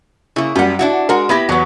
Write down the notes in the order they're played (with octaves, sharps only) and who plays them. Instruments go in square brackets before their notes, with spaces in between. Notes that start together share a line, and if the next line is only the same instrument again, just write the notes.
[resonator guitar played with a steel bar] C#3 A#3 [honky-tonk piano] E4
[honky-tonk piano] F#2 G3 [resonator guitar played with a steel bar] G4 F#5
[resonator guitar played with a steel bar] D4 E4 F#4 [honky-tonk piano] F#5
[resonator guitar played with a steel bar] G#3 F#4 [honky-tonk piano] A#4
[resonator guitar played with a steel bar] B3 E4 G4 [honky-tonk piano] B5 G#6 A#6
[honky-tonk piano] E2 [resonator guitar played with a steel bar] F#3 B3